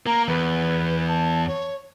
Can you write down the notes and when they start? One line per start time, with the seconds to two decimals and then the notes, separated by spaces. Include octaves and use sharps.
0.06 A#3 A#5
0.28 E2 B4
1.08 A5
1.47 C#5